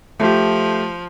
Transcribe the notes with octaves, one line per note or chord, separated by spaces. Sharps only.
F3 A3 G4